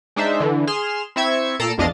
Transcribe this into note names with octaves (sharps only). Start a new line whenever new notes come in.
G#3 D4 D#4 C5 E5
D3 E3
G#4 C6 F6 E7
C4 E4 E5 C#6 G#6
A#2 A4 A#5 C7 D7 E7
A#1 F2 D4 D#5 F5 A6